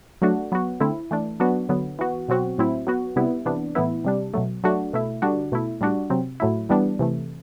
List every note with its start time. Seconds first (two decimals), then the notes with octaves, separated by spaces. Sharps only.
0.22 F#3 A3 D4 F#4
0.52 F#3 B3 F#4
0.80 D3 A3 C4 E4
1.11 E3 A3 D4
1.40 F#3 B3 D4 F#4
1.69 D3 F#3 B3
1.99 E3 B3 F#4
2.28 B2 F#3 C4 F#4
2.58 A2 F#3 C4 E4
2.87 F#3 B3 F#4
3.16 C3 G3 B3 E4
3.46 C3 E3 B3 D4
3.75 A2 E3 B3 E4
4.05 C3 G3 D4
4.34 B2 F#3 A3
4.64 F#3 A3 D4 F#4
4.93 B2 A3 E4
5.22 D3 G3 D4 F#4
5.52 B2 A3 E4
5.81 A2 G3 D4 F#4
6.10 C3 F#3 C4
6.40 A2 F#3 A3 E4
6.69 E3 G3 B3 D4
6.99 C3 E3 A3